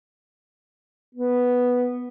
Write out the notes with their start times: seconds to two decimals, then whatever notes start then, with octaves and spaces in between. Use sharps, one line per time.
1.15 B3